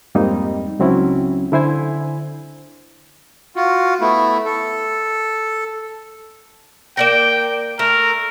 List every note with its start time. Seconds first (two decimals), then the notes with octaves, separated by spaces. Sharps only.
0.15 F2 G#2 G3 A#3 C4 D#4
0.79 C#2 F#3 C4 C#4 E4
1.52 D3 E4 C5 G#5
3.56 F4 F#4
4.01 A3 B3 E4
4.45 A4
6.97 A#3 D5 G5 A#5
7.79 A3 A#4